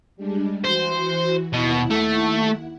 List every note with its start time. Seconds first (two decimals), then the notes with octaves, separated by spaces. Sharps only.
0.17 G3 G#3 D4
0.65 E3 F#4 C5
1.53 D#2 B2 E4 F#5
1.90 A3